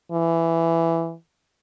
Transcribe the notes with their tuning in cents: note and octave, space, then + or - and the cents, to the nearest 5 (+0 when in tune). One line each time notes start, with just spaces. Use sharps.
E3 +10